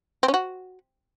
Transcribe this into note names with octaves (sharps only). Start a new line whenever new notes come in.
C4
C#4
F#4